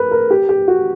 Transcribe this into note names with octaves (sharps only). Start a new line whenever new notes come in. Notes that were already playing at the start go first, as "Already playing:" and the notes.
Already playing: A#4 B4
A#4
G4
G4
F#4